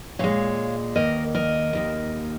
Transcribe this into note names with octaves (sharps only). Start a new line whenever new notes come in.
A#2 G#3 C#5 F5
D#2 D#3 A#3 A#4 D#5
A#4 D#5
D#2 D#3 A#3